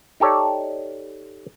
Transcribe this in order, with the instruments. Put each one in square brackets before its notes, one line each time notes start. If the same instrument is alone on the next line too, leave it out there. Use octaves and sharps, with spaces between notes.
[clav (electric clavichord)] D#4 G4 A4 C#5 D5